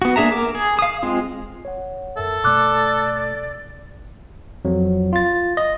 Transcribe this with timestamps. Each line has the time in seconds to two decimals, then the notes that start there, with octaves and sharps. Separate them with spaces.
0.02 B3 F#4
0.16 A#3 D4 G#4 E5 A#5
0.31 A#4 D6
0.55 G#4
0.79 F5 D#6
1.03 G#3 C4 F4
1.65 C#5 F#5
2.17 F#2 A4 A#4 E5
2.44 B2 A3 D5 D6 F#6
4.65 F2 F#3
5.13 F4 A6
5.57 D#5